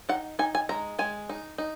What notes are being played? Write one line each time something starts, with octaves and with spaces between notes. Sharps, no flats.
D#4 F#5
D#4 G#5
G#5
G#3 A#5
G#3 G#5
D#4
D#4